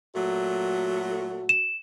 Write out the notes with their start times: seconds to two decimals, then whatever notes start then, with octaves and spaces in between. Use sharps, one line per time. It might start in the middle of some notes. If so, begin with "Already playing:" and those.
0.15 A#2 F#3 A3 F#4
1.49 E7